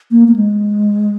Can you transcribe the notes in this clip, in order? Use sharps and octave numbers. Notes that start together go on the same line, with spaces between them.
A#3
A#3
G#3